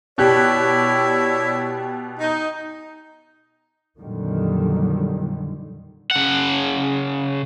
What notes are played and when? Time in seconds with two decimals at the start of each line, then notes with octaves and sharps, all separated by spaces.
0.18 B2 E4 G4 C#5 D5 F#6
2.19 D#4
3.99 F2 A#2 D3 D#3 F#3 G3
6.11 C#3 F#5